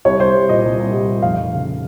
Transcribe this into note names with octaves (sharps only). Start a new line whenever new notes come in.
C2 C#5
C2 C5
G3
A#2 D#5
C2
C2
G3
A#2
F1 F5
F1
C#3